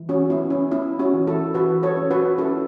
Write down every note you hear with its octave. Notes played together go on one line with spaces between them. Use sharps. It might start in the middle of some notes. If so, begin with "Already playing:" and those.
Already playing: E3
C#4 F#4
B3 E4
C#4
B3 E4
C#4 F#4
E3
E4 A4
E3 F#4 B4
A4 C#5
C#4
F#4 B4
C#4 E4 A4